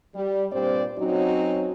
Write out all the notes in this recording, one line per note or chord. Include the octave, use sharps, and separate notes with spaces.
G3
G2 A#2 G3 C4 C5 D5
F#3 C4 C#4 D#4 F#4